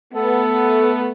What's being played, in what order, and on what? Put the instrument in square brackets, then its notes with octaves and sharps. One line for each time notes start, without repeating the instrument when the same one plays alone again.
[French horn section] A3 B3 [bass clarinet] A4